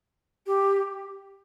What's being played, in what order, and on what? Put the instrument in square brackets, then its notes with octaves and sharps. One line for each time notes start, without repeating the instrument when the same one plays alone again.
[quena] G4